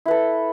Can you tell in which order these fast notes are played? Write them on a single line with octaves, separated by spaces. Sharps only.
E4 B4 A4